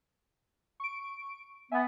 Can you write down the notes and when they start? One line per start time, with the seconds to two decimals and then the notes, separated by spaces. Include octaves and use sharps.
0.80 C#6 D7
1.72 B3 E5 G#5